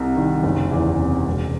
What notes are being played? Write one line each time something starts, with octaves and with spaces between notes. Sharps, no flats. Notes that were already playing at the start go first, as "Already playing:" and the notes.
Already playing: C2 C3
D#3
F#1
E2
C3
E1